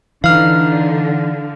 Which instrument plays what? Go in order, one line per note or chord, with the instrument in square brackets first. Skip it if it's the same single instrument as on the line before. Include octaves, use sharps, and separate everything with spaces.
[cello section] D3 [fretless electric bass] E3 [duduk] D#4 [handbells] F5 F6